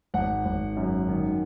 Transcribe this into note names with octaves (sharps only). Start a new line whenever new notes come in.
G#1 F#5
G#1
F#2
D#3